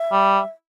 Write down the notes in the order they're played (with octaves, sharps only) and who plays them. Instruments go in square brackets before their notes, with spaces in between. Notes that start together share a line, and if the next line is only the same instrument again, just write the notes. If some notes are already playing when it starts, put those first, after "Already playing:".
Already playing: [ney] E5
[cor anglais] G3